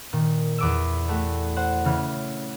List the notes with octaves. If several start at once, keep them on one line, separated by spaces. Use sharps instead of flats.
A#2 D#3
E2 D6 E6
A3 F#4 G4
C5 F#5
C#3 E3 F6